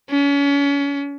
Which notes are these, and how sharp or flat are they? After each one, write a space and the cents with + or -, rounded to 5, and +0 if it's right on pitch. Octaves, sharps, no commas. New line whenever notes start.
C#4 +35